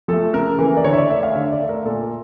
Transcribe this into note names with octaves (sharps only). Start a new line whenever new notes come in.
F3 A3 A4
C#3 A#4
E3 A#3
D5
D3 C#5
E5
D5
A3 E5
F5
D3 E5
D5
A3
A#4
A#2 A4